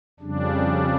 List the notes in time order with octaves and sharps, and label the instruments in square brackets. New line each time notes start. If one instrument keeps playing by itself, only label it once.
[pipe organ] F2 C#3 G3 D4